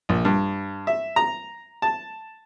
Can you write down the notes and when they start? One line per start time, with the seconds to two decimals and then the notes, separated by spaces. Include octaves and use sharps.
0.09 A#1
0.25 G2
0.87 E5
1.16 A#5
1.82 A5